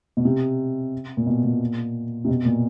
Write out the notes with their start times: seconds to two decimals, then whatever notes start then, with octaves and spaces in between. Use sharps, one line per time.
0.17 B2
0.25 C3
1.17 A#2
1.26 B2
1.44 A#2
2.25 C3
2.28 B2
2.45 A#2